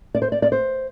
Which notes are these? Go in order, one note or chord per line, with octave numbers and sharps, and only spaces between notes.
D5
C5
D5
D5
C5